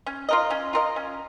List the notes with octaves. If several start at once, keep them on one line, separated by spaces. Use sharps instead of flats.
C#4
F4 A#4 D#5
C#4
F4 A#4 D#5
C#4